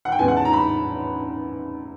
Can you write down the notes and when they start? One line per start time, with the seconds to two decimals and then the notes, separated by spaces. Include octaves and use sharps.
0.05 F#5
0.12 G5
0.19 E2 C#3 E3 G#3 B3 G#5
0.28 F#5
0.37 A5
0.45 A#5
0.53 B5